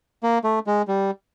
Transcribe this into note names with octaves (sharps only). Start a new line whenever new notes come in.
A#3
A3
G#3
G3